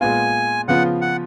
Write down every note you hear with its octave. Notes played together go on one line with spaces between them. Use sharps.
A#2 G#3 B3 F4 G#5
C#3 F3 B3 F4 F#5
F#5